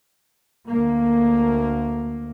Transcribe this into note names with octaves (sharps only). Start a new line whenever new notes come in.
D2 A#3